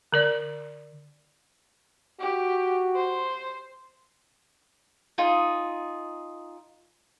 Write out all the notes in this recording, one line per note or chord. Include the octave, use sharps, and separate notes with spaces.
D3 A#4 D5
F#4 G4
C5
D#4 F4 G#4